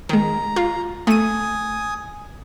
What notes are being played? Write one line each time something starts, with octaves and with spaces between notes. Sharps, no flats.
D#3 G#3 A#5
F4
A3 G#5 D#6 D#7